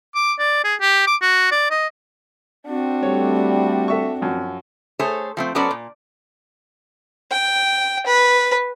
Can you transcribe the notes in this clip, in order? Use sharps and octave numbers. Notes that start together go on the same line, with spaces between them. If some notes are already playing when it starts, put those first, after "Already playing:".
D6
D5
G#4
G4
D6
F#4
D5
D#5
C4 D4 F#4
G3 A3 C#5
A4 E5 C#6
F#2 F3
A3 G#4 A4 C5 C#5
F3 A3 C4
F#3 B3 C#4 A4 C5 D5
A#2
G5
B4